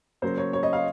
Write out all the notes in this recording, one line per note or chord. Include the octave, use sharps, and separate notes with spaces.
C#3 F#3 A#3 C5
C#5
C#5
D#5
F5